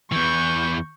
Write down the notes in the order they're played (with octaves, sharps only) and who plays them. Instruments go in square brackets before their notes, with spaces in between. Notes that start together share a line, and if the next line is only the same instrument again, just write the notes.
[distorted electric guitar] E2 E3 [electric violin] C#6 G6